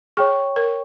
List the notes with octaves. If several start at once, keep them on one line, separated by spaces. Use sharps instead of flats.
G#4 C#5 G5 C#6
A#4